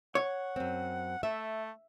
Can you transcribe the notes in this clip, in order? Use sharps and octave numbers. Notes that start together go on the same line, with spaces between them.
C#5 F#5
F#2 C4
A3 E5